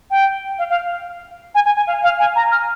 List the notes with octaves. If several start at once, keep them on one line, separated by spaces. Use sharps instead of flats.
G5
F5
F5
G#5
G#5
G#5
F5
F5
G#5
A#5
F6